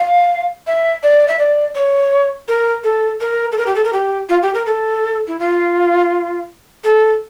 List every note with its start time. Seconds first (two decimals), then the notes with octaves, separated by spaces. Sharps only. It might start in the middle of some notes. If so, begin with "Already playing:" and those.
Already playing: F5
0.67 E5
1.03 D5
1.28 E5
1.39 D5
1.75 C#5
2.48 A#4
2.84 A4
3.21 A#4
3.52 A4
3.58 A#4
3.66 G4
3.75 A4
3.84 A#4
3.93 G4
4.29 F4
4.42 G4
4.54 A#4
4.66 A4
5.27 E4
5.39 F4
6.84 A4